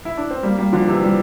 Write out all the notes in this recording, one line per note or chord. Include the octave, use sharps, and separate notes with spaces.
E4
D4
C4
G3 A#3
G3 A#3
D3 F3
C3 E3
E3 G3